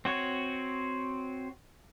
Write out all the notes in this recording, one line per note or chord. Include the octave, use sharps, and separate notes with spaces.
C4 F#4 C#5